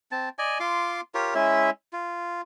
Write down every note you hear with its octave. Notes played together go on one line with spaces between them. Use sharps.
C4 A5
D5 D#5 G#5
F4 C6 D6
F4 G4 A#4 C#5
G#3 C#4 E4 E5
F4